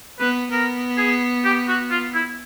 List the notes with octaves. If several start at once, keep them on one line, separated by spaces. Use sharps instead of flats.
B3 B4
B3 A#4
G#4
G4
F#4
F4
E4